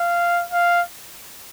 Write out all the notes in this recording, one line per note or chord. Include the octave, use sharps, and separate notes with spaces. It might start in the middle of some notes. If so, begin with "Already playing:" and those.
Already playing: F5
F5